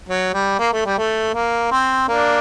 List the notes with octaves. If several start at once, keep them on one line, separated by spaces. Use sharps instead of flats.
F#3
G3
A#3
A3
G3
A3
A#3
C4
A#3 D4